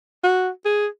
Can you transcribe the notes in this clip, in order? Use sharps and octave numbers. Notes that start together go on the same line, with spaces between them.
F#4
G#4